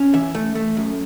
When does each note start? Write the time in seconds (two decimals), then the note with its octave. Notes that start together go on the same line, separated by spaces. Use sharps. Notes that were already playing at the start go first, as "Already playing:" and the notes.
Already playing: C#4
0.14 E3 E5
0.35 A3
0.55 A3
0.77 F#2